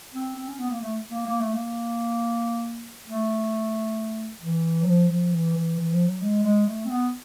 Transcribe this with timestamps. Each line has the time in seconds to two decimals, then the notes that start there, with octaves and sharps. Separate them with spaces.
0.14 C4
0.36 C4
0.48 C#4
0.59 B3
0.70 A#3
0.81 A3
1.11 A#3
1.26 A#3
1.40 A3
1.53 A#3
3.06 A3
4.41 E3
4.82 F#3
4.87 F3
5.08 F3
5.32 E3
5.54 E3
5.76 E3
5.91 F3
6.06 F#3
6.21 G#3
6.43 G#3
6.66 A3
6.85 C4
6.89 B3